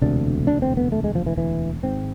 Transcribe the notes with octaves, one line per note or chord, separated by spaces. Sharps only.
E1 D2 C3 D4
D4
C4
B3
A3
G#3
F3
E3
E3
G#1 G#2 C4